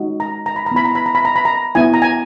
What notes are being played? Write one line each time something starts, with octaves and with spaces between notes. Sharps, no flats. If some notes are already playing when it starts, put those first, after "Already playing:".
Already playing: G#3 D#4 F#4
A#5
A#5
B5
A#5
B3 E4 B5
A#5
B5
A#5
B5
A#5
B5
A#5
B3 E4 G#5
A#5
G#5